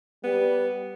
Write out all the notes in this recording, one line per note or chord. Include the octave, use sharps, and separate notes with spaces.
G3 B3